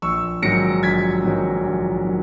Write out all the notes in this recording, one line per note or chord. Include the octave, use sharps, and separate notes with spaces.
A#1 C#6 E6
G#2 D#3 F#3 A#6 C#7
A#1 G#6 B6
G#2 D#3 F#3
A#1
D#3 F#3